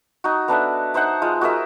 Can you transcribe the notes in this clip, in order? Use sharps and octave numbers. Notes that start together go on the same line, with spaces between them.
D#4 F#4
B3 D4 A4 E5
D#4 C5 E5 F#5
G#3 F4
F#4 G#4 A#4 E5